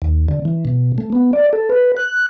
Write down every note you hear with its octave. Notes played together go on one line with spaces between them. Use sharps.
D#2
D3
E3
B2
A3
B3
D5
A4
B4
F#6